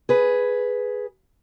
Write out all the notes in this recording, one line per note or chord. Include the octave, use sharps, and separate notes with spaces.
G#4 B4